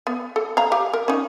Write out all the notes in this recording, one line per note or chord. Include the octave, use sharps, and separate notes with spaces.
B3
A4
F5 A#5
G4 F5
A#4
C#4 D#4